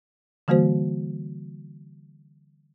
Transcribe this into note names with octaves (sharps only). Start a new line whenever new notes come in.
D3 E3 G3 A#3 F#4 C5